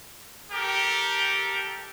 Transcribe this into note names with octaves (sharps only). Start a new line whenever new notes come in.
G4 A4 A#4